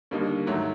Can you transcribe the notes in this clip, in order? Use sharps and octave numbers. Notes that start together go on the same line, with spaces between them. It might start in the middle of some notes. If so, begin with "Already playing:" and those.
D#2 D3 G3 A#3 D#4
G#2 D#3 F#3 A3